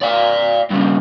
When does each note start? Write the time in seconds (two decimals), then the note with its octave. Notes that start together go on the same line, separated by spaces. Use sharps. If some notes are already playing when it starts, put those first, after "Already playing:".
0.01 D5 F5
0.71 G2 C#3